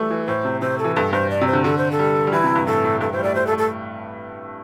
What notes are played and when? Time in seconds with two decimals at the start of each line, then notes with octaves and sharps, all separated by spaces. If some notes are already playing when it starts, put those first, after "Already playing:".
Already playing: E3 G3 A3 A4
0.10 E3
0.27 A2 C5
0.45 C3
0.61 C3 C5
0.78 A4
0.84 E3
0.96 G2 A4
1.13 G2 C5
1.30 D5
1.41 C3
1.47 C5
1.53 D3
1.64 D3 A4
1.78 C5
1.91 A4
1.99 G3
2.27 G3
2.32 E3 E4
2.44 C3
2.55 G2
2.67 A2 A4
2.84 A2
3.00 G2 A4
3.13 A2 C5
3.19 G3
3.24 A3 D5
3.35 A3 C5
3.47 A4
3.52 A3
3.58 A4